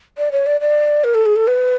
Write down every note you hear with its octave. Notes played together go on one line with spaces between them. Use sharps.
D5
C#5
D5
D5
A#4
A4
G#4
A4
B4